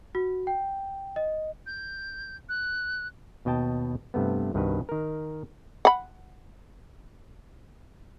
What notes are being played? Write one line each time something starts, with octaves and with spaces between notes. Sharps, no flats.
F#4
G5
D#5
G6
F#6
D#2 B2 D#5 G5 A5
G2 C3 A3 B3
C2 G2 D#3 B3 F#4 B4
D#3 A#4
F#5 B5